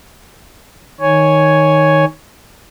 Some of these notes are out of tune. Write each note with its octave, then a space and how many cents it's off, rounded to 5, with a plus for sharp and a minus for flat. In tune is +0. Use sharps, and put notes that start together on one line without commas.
D#3 +0 C#5 +0 G#5 +0